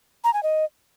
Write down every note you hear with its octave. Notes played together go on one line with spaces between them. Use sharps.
A#5
G#5
D#5